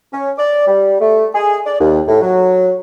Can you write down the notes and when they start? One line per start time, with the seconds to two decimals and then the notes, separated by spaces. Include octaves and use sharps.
0.12 C#4
0.38 D5
0.67 G3
1.01 A3
1.34 G#4
1.66 D5
1.80 D#2
2.08 A2
2.22 F#3